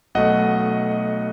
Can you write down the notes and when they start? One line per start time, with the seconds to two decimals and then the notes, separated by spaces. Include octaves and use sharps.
0.15 B1 B2 A3 D#5 F#5